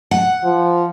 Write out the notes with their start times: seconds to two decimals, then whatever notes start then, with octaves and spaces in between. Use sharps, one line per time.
0.11 F#5
0.44 F3